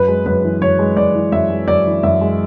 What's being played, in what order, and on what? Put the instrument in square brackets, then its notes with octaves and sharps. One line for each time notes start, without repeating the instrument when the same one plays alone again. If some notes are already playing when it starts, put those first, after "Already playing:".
Already playing: [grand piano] F#2 B4
G#3
F#2 B4
E3
F#2 C#5
G#3
F#2 D5
E3
F#2 E5
G#3
F#2 D5
E3
F#2 E5
G#3